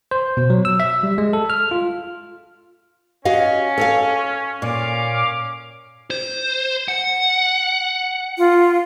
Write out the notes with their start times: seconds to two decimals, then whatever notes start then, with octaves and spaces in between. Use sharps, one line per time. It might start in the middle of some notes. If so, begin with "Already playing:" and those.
0.11 C5
0.37 B2
0.50 F#3
0.65 E6
0.80 E5
1.03 G3
1.18 G#3
1.33 A4
1.50 F6
1.71 F4
3.25 C#4 F#4 D#5 F5
3.78 A4 C#5 F5
4.62 A#2 C#4 F5 D6
6.10 C5
6.88 F#5
8.38 F4